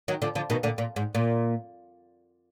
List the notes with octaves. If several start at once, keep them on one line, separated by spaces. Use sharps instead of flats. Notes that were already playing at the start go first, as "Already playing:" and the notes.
D#3 F#3
D3 F3
D3 F3
B2 D#3
A#2 D3
A#2
G#2
A#2